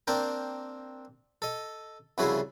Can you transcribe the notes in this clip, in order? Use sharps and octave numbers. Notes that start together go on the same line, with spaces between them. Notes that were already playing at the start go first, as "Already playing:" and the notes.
A#3 C4 D4 A#4 G5
A4 D#5
C2 C#3 F3 E4 F#4 G#4